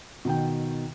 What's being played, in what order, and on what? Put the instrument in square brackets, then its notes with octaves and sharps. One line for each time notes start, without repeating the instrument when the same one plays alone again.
[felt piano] B2 D#3 G5